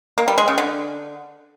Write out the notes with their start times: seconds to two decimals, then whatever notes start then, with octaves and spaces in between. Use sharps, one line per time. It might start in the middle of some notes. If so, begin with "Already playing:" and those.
0.18 A#3
0.28 G3
0.38 G#3
0.48 C#3
0.58 D3